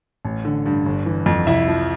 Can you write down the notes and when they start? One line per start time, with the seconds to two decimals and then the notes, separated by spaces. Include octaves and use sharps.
0.25 A1
0.45 D3
0.66 G2
0.86 G1
1.06 E3
1.26 F2
1.47 C2 E4 E5
1.68 F3